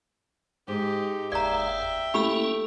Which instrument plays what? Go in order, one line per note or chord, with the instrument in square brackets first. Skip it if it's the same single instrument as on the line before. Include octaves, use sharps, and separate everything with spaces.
[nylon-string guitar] G#2 [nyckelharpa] D#4 G4
[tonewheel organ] F#1 D#2 F5 [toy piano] D5 A#5 [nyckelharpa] E5 G5
[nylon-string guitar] A3 [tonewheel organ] A#3 C#4 E4 [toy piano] G4 B5 E6